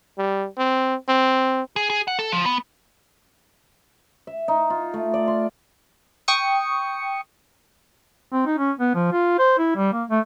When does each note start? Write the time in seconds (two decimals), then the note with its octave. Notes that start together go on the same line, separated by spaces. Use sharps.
0.18 G3
0.57 C4
1.09 C4
1.76 G#4
1.90 G#4
2.08 F#5
2.19 A4
2.32 F3
2.46 B3
4.27 E5
4.48 D#4
4.70 F4
4.94 A3
5.14 D5
5.27 C6
6.28 G5 C#6 D#6 C#7
8.32 C4
8.46 D#4
8.58 C#4
8.79 B3
8.95 F3
9.12 F4
9.39 C5
9.59 E4
9.76 G3
9.93 A#3
10.10 A3